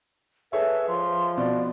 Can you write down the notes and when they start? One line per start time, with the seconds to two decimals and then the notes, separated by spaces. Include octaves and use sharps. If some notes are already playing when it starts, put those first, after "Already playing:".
0.53 G#4 A4 B4 C#5 E5
0.89 F3 C6
1.37 B2 D5